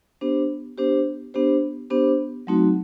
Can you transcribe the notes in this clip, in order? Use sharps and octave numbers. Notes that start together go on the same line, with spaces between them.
B3 D4 G4 C5
B3 D4 G4 C5
B3 D4 G4 C5
B3 D4 G4 C5
F#3 A3 C4 D#4 F#4